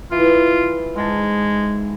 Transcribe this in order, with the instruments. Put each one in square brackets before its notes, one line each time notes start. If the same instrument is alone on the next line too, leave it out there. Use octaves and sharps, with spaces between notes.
[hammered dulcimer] E3 [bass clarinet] F4
[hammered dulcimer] G#2 A5 [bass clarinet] G#3